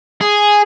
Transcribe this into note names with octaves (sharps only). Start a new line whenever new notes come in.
G#4